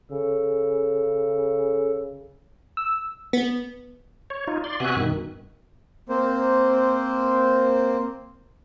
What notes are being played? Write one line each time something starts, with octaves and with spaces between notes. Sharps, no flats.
C#3 A4
E6
B3
C#5
D#4 F4
D5 C6
C3 B3 F#4 E5 G#5 F#6
G2 B2 D#3
A#3 C4 C5